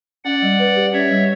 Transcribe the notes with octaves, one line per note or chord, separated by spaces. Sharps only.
C#4 D5 F#5
G3
B4
G4
C#4 C#5 E5
G3